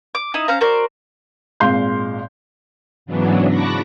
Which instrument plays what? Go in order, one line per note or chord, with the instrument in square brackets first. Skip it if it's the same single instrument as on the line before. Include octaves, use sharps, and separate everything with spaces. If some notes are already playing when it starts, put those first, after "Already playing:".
[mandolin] D6
D#4 E4 D#5
C#4 C5 F5 A#5
F#4 A#4 C5 D5
[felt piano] G#1 A#2 G#3 F5 C6 G6
[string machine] G#2 C#3 E3 F#3 B3 D4
A5 B5 C#6 D6 F#6 A#6